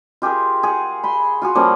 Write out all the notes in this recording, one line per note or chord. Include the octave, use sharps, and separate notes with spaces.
F4 G4 G#4 A#4
G#4 F#5
B5 C6
F4 F#4 G#4
F3 G3 A#3 C#4